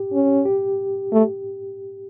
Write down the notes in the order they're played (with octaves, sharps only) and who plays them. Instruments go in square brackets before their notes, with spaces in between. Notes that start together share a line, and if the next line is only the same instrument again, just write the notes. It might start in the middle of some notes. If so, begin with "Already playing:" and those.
Already playing: [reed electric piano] G4
[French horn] C#4
[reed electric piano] G4
[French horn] A3